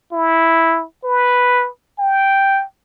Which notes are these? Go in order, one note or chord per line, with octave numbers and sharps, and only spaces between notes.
E4
B4
G5